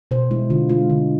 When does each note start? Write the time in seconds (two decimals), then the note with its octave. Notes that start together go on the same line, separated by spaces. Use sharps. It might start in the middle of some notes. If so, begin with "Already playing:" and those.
0.11 B2 C5
0.31 G#3 E4
0.50 D3 F4
0.69 G#3 F4
0.90 D3